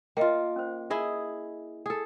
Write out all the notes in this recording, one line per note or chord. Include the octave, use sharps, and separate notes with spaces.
A#3 F4 D#5 F5 G5
C#4 C5
E4 G#4 D#5
G#4 A4